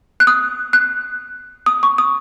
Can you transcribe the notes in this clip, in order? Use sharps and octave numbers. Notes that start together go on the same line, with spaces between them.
F#6
D#6
F#6
D#6
C#6
D#6